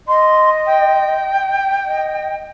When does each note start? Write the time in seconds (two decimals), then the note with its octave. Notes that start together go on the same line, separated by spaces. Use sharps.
0.07 D#5 C6
0.66 G5
1.85 D#5